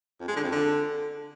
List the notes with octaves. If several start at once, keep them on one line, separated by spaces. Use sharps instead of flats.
F2
G#3
D3
F2
D3